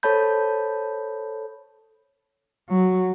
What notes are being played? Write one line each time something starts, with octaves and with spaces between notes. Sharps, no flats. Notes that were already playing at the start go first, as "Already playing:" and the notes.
A4 C5 C#5 A5 B5 G6
F#3